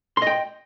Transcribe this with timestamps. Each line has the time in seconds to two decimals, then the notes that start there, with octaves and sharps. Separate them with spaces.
0.17 C6
0.22 D#5
0.27 G5